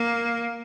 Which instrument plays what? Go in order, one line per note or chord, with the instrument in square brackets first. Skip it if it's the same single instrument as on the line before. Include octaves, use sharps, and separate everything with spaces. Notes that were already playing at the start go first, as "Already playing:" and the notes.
Already playing: [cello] A#3